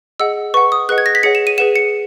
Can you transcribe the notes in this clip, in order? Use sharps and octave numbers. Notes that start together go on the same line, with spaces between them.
G#4 D#5 F#5 E6
B4 F#5 C#6
D#6
G#4 B4 D#5 F#5 F#6
G#6
A#6
B6
G#4 C#5 F#5 C#7
E7
D#7
G#4 B4 F#5 E7
C#7